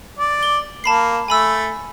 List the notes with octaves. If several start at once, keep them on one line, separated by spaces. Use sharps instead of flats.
D5
G7
A#3 A5 B5 C7
A3 G#5 B5 E6